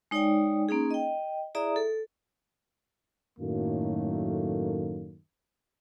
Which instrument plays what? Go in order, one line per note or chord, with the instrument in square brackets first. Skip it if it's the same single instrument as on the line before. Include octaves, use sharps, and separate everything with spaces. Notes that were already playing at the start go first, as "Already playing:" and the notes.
[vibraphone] G#3 D#4 C#5 D5 G5 G#5
A#3 C#4 D#4 G#4
D#5 G5
E4 G#4 D5 E5 A#5 D#6
A4
[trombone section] F#2 A2 D#3 F#3 A3 A#3